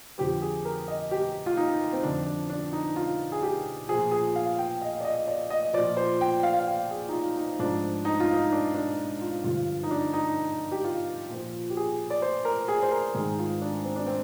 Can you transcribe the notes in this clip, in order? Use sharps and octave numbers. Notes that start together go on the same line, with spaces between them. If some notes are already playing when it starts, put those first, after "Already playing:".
F2 D3 F3 G4
G#4
A#4
D#5
G4
F4
D#4
C4
F2 D3 F3 D4
D4
D4
D#4
F4
G#4
G4
A#2 F3 G#4
G#4
F5
G5
D#5
D5
D#5
D5
D#5
A#2 F3 D5
C5
G5
F5
F5
G5
G#4
D#4
F4
D#4
G#2 F3 D4
D#4
F4
D#4
D4
D4
F4
G2 D3 F3 F4
D#4
D4
D#4
G4
F4
A#2 F3
G4
G#4
D5
C5
A#4
G#4
C5
A#4
G#2 D#3 G#4
F4
D4
C4
D4
C4